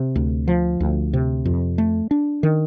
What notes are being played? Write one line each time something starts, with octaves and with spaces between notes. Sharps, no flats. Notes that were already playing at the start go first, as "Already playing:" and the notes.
Already playing: C3
D2
F3
D2
C3
F2
A3
D4
D#3